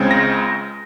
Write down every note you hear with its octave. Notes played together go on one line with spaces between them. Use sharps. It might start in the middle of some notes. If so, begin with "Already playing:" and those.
Already playing: C#2 C#3 G#3 C4
A#6